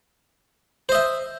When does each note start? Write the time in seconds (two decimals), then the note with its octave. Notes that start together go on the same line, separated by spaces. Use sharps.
0.89 C5
0.92 D#5
0.95 E5